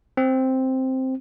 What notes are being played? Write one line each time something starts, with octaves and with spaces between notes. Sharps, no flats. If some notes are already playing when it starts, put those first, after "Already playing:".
C4